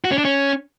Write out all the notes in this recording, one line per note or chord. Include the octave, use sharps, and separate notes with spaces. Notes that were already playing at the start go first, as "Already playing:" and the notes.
F#4
C#4
D4
C#4